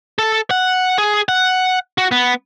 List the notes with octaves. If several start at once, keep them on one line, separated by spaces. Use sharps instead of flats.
A4
F#5
G#4
F#5
F#4
B3